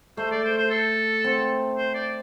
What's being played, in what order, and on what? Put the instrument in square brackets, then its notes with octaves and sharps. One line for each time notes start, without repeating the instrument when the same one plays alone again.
[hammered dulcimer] A3 [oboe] C5
[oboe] D5
C5
C5
A4
[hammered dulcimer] C4
[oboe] C5
D5